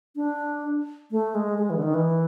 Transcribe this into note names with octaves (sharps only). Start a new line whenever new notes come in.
D4
A3
G#3
G#3
E3
D3
D#3
E3